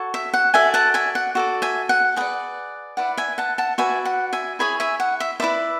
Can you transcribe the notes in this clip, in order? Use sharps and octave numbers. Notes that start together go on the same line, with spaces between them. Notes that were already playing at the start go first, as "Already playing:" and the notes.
Already playing: F#4 A4 C#5
E5
F#5
F#4 A4 D5 E5 G#5
F#5 A5
E5 G#5
F#5
F#4 A4 D5
E5 G#5
F#5
G#4 B4 D5 F#5
E4 B4 D5 F#5
E5 G#5
F#5 A5
F#5 A5
F#4 B4 D5 E5 G#5
F#5
E5 G#5
E4 G#4 C#5 G#5 B5
E5 G#5
F#5
E5
E4 B4 D5 E5